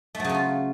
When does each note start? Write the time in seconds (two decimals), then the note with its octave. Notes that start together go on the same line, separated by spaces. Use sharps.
0.15 A3
0.20 F#3
0.24 C#3
0.29 C#4
0.34 F4